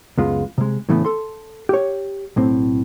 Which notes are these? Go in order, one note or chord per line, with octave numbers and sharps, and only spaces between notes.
C#2 F#2 G#3 B3 F4
C3 G#3
A2 C#3 E3 A3 B3
A4 C6
G4 C#5
B1 A2 C4